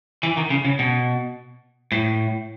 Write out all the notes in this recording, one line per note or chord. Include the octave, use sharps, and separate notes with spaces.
E3
D#3
C#3
C#3
B2
A2